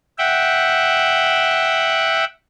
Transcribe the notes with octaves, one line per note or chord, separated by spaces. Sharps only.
E5 F#5 G5